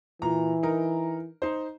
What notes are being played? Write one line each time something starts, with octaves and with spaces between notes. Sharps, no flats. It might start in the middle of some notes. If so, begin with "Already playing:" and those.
A#2 E3 A#5
D#4 A#4
D#4 C5